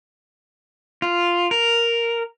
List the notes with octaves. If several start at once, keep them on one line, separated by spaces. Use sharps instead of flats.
F4
A#4